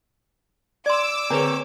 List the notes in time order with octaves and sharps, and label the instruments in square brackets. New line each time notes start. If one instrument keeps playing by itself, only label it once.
[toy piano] D5 C6 [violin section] D6 E6
[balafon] D3 B4 [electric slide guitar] C4 C#5 [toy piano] G#4 G#5